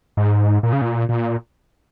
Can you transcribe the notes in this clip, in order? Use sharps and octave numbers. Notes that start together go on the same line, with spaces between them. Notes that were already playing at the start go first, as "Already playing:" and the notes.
G#2
A#2
C#3
A#2
A#2